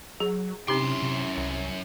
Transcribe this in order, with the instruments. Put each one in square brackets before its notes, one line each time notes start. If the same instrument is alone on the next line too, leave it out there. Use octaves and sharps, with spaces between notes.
[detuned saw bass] F#3 [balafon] G#4
[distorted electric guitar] F#2 C6 [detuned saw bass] C3 [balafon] C4 D#4 G4 [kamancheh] C#4 E4
[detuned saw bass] C3
C2